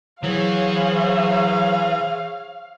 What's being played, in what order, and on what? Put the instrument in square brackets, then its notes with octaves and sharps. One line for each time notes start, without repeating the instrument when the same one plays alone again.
[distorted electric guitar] E3 [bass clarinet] F#3 [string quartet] G#4 C5 C#5 [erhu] F5